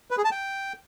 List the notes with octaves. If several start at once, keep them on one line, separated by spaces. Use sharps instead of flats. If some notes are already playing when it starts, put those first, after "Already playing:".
B4
G#4
A5
G5